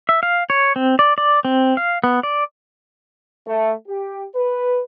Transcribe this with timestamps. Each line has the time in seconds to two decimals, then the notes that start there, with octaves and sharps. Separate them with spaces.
0.09 E5
0.23 F5
0.50 C#5
0.76 C4
0.99 D5
1.18 D5
1.45 C4
1.77 F5
2.04 B3
2.23 D5
3.47 A3
3.87 G4
4.35 B4